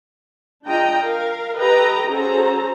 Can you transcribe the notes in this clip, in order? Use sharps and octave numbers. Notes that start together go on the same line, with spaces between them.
D4 F4 G#4 D#5 G5 A#5
A#4 F5
G4 A4 B4 D#5 G5 A#5
C#4 F#4 G#4 A4 C5 A#5